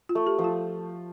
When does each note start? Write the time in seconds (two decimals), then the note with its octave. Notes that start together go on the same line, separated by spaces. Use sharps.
0.09 F4
0.15 A3
0.27 G4
0.39 F3
0.44 F4